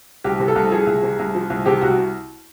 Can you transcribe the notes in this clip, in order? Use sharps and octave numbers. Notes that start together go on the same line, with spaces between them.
C2 G4
C3
A4
C2
F3 G#4
C2
C3
C2
F3
C2
C3 G4
C2 F#4